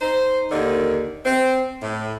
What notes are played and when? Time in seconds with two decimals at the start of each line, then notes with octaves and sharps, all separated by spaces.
0.01 D#4 C5
0.51 D#2 D3 D#3
1.25 C4
1.82 A2